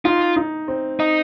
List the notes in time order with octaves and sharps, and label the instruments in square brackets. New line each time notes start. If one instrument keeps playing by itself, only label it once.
[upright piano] D#4 [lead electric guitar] F4
[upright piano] D#4
C4
[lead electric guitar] D#4